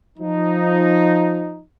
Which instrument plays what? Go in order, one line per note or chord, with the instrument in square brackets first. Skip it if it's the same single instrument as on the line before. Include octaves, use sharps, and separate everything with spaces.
[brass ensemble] F3 D#4